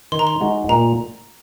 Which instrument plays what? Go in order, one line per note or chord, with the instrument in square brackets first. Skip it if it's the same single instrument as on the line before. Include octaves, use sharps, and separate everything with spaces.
[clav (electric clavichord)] D#3 [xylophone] C6
[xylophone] A#5
C6
[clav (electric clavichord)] G#3 D#4 F#4
[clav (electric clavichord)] A#2 [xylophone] A#5